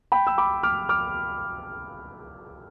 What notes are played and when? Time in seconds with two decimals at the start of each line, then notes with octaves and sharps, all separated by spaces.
0.12 G5 B5
0.27 E6
0.38 B5 D6
0.63 D6 F6
0.89 D6 F6